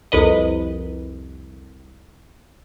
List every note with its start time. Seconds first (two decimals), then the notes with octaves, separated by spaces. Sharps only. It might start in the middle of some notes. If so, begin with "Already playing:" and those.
0.12 C2 F2 B4 D#5